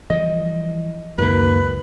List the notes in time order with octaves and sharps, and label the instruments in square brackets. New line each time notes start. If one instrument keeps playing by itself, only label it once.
[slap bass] E3 F3 G3 [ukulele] D#5
[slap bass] C#2 [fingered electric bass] F#2 D#3 A#3 [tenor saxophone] B4